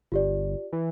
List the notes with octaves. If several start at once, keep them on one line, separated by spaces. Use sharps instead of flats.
G1 F4 G4 D5
E3